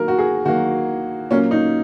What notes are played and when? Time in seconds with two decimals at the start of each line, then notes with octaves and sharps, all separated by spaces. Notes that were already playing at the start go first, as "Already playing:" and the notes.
Already playing: D#3 F#3 A#3 A#4
0.08 F#4
0.18 G#4
0.46 D#3 F#3 A#3 F#4
1.31 A#2 F#3 A#3 C#4
1.51 D#4